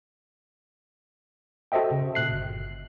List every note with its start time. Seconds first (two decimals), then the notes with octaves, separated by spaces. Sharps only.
1.72 F#4 A4 C5 D#5 E5 G5
1.91 C#3
2.15 A#2 F#6 C7
2.31 G1